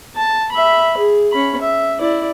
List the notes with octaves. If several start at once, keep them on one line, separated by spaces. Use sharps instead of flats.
A5
E5 B5
G#4
C#4 B5
E5
E4 D5